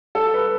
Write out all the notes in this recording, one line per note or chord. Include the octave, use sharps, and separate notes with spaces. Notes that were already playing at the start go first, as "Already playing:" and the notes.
A4
B4